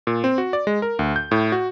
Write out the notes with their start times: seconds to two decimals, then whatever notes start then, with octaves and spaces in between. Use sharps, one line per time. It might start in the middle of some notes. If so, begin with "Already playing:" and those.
0.07 A#2
0.24 C4
0.38 F#4
0.53 D5
0.67 G#3
0.82 A#4
0.99 D2
1.16 G6
1.31 A2
1.52 F#4